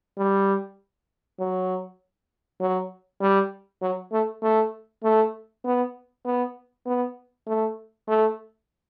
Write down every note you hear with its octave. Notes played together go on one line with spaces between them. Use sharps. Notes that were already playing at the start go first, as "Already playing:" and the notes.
G3
F#3
F#3
G3
F#3
A3
A3
A3
B3
B3
B3
A3
A3